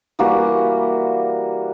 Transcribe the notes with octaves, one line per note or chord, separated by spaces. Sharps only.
E3 G3 A#3 F#4